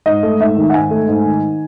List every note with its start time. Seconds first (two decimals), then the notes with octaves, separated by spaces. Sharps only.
0.06 G#2 D#5
0.23 A3
0.40 G#2 E5
0.57 D#3
0.70 F#5
0.74 G#2 G#5
0.91 A3
1.08 G#2
1.25 D#3